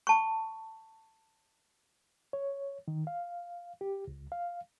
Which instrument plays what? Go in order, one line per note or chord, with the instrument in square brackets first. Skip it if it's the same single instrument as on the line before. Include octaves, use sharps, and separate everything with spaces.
[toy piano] A5 C#6
[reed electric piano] C#5
D#3
F5
G4
C#2
F5